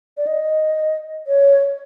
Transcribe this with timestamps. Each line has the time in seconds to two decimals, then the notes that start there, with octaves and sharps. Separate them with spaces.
0.18 D5
0.27 D#5
1.27 C#5